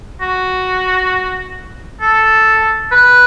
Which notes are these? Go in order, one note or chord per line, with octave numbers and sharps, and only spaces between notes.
F#4
A4
B4